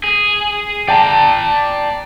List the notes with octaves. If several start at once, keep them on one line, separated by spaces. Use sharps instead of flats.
G#4
D5 G5 A5 A#5